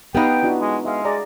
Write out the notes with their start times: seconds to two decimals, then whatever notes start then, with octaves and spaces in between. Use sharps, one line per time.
0.15 B3 D#4 G4 B4 F5 G5
0.43 D4 E4 F#4
0.61 G#3
0.85 G#3 E5 F5
1.05 G#4 D5 A#5